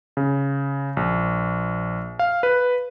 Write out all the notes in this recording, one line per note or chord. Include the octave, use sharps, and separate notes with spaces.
C#3
A#1
F5
B4